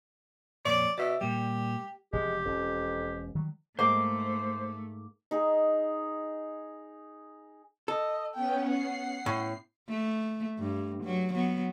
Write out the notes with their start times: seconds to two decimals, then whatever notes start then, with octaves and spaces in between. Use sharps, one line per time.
0.66 F2 A#2 C#5 D5
0.98 B2 D5 E5
1.21 A#2 G3 G4
2.13 E1 C3 F3 G#3 G4
2.45 E1 F2 C#4
3.35 D#3 F#3 G3
3.79 G#2 A3 A#3 C5 D6
5.31 D#4 G#4
7.88 A4 D#5
8.34 B3 C#4 G5
8.69 F#5 C7
9.26 A2
9.89 A3
10.59 G2
11.04 F#3
11.34 F#3 B3